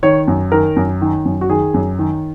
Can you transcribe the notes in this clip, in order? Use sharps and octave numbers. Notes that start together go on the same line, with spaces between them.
D#3 C#5
F#2
D#3 A#4
F#2
D#3
F#2
F#4
D#3 G#4
F#2
D#3